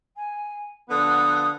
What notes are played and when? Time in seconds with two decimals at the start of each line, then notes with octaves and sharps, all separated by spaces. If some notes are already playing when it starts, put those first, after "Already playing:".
0.15 G#5
0.89 D3 F3 B3 D#6 F#6